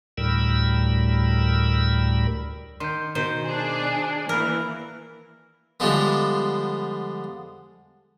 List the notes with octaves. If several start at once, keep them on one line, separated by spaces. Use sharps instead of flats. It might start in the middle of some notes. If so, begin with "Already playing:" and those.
D2 A2 G3 A#4 B5 E6
D#3 C6 G6
B2 D#3 C5 G6
D4 G#4
D5
E3 A#3 A#4 F6
D3 F3 G3 G#3 B3